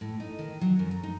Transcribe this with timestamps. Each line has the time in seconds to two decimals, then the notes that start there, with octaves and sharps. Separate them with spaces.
0.01 A2
0.20 D#4
0.39 D#3
0.61 F#3
0.79 F#2
0.91 A#5
1.03 D#4